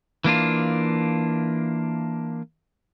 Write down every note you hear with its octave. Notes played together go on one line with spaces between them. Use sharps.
E3 A#3 D4 F4